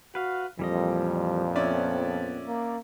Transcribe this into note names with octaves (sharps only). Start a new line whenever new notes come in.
F#4 B4 F5
F2 A#2 E3 F3 G3 D#5
B3 C#4 D5 E5
A#3